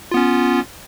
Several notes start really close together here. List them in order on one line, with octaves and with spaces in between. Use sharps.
F4 B3 C#4